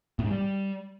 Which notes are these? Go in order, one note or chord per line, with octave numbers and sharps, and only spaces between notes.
A2
G#2
G3